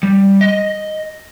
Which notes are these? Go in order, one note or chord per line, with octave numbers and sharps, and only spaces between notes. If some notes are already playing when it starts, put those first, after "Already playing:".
G3
D#5